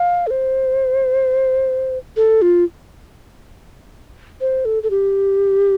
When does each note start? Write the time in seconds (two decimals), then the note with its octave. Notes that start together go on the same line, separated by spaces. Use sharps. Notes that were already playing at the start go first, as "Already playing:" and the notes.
Already playing: F5
0.27 A4
0.31 C5
2.16 A4
2.42 F4
4.41 C5
4.65 A4
4.83 A4
4.90 G4